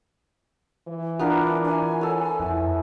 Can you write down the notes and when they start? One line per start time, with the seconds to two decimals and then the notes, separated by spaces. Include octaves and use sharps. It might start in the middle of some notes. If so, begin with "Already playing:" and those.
0.88 E3
1.19 B3 D4 F4 A#4
1.65 G#5
2.01 A4 C#5
2.40 F2 E4